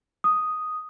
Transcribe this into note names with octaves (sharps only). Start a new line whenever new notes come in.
D#6